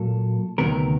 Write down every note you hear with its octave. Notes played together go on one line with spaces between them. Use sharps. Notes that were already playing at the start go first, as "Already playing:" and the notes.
Already playing: A#2 F#3 A#3 A4
D2 C3 D#3 F#3 B3 A#4